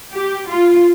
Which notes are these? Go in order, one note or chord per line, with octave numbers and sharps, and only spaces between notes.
G4
F4